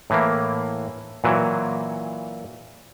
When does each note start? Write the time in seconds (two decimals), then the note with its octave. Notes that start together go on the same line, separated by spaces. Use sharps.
0.10 A2 E3 A#3
1.24 A#2 E3 F#3